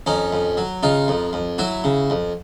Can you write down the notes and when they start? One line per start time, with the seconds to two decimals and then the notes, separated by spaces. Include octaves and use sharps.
0.06 F2 C#4 D#4
0.33 F2
0.57 F#3
0.83 C#3 D#4 F4
1.08 F2
1.33 F2
1.58 F#3 E4 F#4
1.84 C#3
2.10 F2